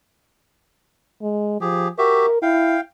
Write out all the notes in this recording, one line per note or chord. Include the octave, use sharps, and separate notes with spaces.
G#3
F3 G4 G#4
F#4 G4 A#4 E5
E4 F5 G5